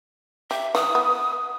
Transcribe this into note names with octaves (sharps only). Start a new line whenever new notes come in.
G4 E5
E3 D#6
B3